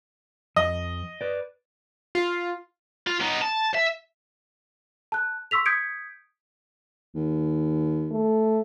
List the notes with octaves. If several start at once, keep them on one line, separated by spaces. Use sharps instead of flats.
F2 D#5
B4 D5
F4
F4
B3 D#4
A5
E5
A5 F#6
C6 C#6 E6 B6 F7
D#6 G6 G#6 B6 C#7 D7
D#2
A3